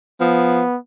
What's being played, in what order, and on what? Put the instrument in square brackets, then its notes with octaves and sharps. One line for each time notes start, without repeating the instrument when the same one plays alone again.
[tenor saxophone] F3 [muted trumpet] B3